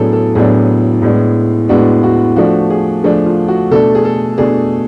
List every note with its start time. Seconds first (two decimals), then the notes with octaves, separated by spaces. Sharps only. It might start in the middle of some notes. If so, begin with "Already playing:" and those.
Already playing: A2 F#3 B3 D4 G#4 A4
0.13 A4
0.35 A2 F#3 B3 D4 G#4
1.02 A2 G#3 B3 D4
1.69 A2 G#3 B3 D4 F#4
2.03 F#4
2.36 F3 A3 D4 F#4
2.70 G#4
3.04 F3 A3 D4 G#4
3.26 F4
3.48 F#4
3.71 B2 A3 D4 A4
3.95 G#4
4.05 A4
4.38 B2 A3 D4 G#4